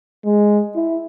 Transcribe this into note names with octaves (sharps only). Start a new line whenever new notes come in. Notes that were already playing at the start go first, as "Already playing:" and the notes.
G#3
E4